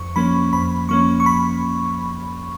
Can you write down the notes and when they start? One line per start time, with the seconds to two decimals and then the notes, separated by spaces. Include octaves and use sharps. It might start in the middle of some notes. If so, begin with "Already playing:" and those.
Already playing: F2 C#6
0.16 F3 A#3 C#4 B5
0.53 F2 B5
0.89 F3 A#3 C#4 C#6
1.20 C#6
1.26 B5